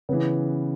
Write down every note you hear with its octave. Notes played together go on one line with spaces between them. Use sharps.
C#3 E3 B3